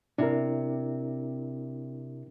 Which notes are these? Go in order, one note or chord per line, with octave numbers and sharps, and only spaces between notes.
C3 D4 E4 A#4